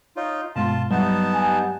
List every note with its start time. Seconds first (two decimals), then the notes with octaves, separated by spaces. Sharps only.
0.16 D#4 F4 C#5
0.56 G2 B2 G#3 F4 A5 C6
0.91 F#3 G3 B3 D#4 A5
1.34 G#5